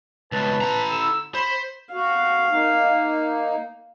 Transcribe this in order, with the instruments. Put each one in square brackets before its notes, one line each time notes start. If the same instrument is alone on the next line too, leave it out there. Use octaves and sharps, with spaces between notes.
[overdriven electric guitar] C#2 B2 [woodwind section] B4 A5
[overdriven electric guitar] E4 A#5
[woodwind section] D3 E6
[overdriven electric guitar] C5 [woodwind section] B5
[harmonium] F#4 [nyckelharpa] F5
[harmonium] A#3 D#4